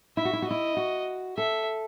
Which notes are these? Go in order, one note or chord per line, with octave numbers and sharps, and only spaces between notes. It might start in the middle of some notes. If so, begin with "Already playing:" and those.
E4 E5
F#4
E4
F#4
E4 D#5
F#4
A4 E5